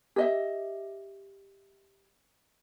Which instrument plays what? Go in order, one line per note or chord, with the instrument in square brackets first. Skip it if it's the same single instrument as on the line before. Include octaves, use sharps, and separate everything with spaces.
[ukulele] G4 D#5 E5